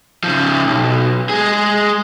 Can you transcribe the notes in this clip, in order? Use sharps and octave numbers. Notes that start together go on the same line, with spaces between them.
C#3 F3
B1
G#3 G#4